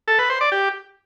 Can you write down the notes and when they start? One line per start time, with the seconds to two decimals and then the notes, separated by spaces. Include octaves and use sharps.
0.08 A4
0.19 B4
0.30 C5
0.41 D5
0.52 G4